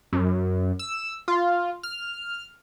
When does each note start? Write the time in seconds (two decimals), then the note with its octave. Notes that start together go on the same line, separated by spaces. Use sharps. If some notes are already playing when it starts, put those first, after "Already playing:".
0.13 F#2
0.79 E6
1.28 F4
1.83 F6